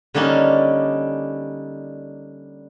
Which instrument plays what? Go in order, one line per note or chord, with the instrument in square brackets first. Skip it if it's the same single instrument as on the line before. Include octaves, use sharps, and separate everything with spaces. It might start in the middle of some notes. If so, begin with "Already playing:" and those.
[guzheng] D3 G3 A#3 C#4 D#4 C6